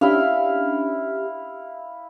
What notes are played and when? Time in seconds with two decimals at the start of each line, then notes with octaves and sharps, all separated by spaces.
0.01 C#4 D4 E4 G4 E5 F5